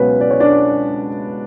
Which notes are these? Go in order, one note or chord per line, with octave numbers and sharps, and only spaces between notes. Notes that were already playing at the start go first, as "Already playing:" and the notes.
Already playing: C#2 B2 F#3 B3 C#4 B4 C#5
D5
C#5
D4 D5